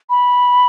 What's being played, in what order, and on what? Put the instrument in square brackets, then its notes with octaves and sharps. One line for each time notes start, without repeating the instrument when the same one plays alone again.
[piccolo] B5